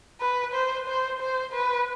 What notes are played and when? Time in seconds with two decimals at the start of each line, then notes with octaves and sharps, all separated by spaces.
0.21 B4
0.54 C5
0.87 C5
1.21 C5
1.53 B4